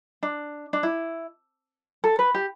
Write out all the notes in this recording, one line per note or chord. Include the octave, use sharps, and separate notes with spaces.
D4
D4
E4
A4
B4
G4